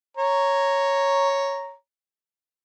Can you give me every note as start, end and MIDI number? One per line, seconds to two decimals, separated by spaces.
0.17 1.73 73
0.17 1.73 82